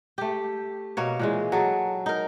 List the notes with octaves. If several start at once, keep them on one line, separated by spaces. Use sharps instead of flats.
A3 G4
B2 A#3 C#5
A#2 E3 G#3
F#3 G#4 A4
D#4 A#4